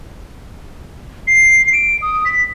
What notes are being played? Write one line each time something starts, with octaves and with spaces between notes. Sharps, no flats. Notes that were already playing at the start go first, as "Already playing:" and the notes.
C7
D7
D#6
B6